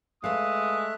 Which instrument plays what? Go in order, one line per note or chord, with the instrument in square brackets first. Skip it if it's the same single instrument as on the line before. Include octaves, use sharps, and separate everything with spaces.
[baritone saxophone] G#3 [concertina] A3 E5 F#6 [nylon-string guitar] B4 F5 [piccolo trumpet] D#6